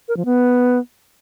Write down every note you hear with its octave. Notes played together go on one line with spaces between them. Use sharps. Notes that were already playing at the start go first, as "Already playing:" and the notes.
A#4
F3
B3